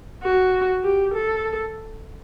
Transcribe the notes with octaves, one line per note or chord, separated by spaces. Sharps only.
F#4
G4
A4